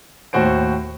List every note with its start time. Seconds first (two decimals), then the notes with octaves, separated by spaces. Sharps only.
0.33 D#2 A2 F#4 C5 D7